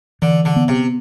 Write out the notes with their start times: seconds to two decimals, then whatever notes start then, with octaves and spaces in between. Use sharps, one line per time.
0.22 D3 E3
0.45 D3
0.56 B3
0.68 C3